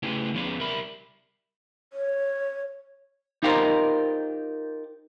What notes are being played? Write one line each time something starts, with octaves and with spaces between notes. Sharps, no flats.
C#3 A3 E4 G4 G#4 B4
F3 B3 C#4 G#4 B4 D5
G3 A#4 E5 B5
C#5
D#4 F4 G4 A#4 C5